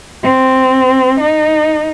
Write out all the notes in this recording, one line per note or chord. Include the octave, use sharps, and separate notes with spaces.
C4
D#4